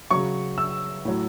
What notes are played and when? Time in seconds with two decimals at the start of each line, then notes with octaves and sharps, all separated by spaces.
0.11 C#3 F#3 C#6
0.58 E6
1.05 A2 F#3